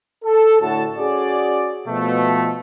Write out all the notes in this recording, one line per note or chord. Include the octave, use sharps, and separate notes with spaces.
A4
A2 D3 F#4 A5
C#4 F#4 G#4 D5
B2 F3 A3